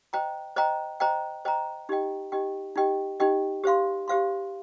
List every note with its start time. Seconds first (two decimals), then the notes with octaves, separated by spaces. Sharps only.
0.13 C5 D#5 G5 A#5
0.56 C5 D#5 G5 A#5
1.00 C5 D#5 G5 A#5
1.45 C5 D#5 G5 A#5
1.89 D#4 G4 D#5 G5
2.32 D#4 G4 D#5 G5
2.76 D#4 G4 D#5 G5
3.20 D#4 G4 D#5 G5
3.64 G4 C5 F5 C6
4.08 G4 C5 F5 C6